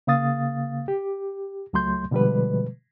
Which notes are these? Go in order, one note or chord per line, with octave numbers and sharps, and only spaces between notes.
C#3 A#3 F5 D#6 A6
G4
C#2 F#3 A3 C6 G6
B2 D3 F3 G3 G#3 B4